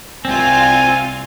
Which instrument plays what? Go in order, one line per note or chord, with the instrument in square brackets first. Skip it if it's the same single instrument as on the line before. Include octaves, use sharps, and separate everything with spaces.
[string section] C2 F4 [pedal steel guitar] C4 [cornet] G#5